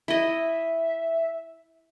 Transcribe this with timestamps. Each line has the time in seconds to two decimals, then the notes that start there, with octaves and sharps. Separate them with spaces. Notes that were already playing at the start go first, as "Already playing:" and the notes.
0.08 E4 D#5 E5